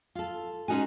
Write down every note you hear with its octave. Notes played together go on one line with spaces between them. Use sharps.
F4 A4
G#3 C#4 D#4 F#4 G#5